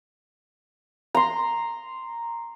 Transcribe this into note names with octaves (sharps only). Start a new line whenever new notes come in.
A#5 C6